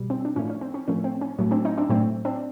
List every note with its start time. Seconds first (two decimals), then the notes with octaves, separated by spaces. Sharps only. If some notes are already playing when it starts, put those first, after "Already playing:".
Already playing: B2 G3
0.10 C4
0.25 D4
0.36 A2 F3 A3 C#4
0.50 C#4
0.61 C4
0.74 C#4
0.88 A2 F3 A3 C#4
1.04 C4
1.21 C#4
1.39 A2 F#3 A3 C#4
1.51 C4 D4
1.65 C#4 D#4
1.78 C4 D4
1.90 A2 F#3 A3 C4
2.25 C4 D4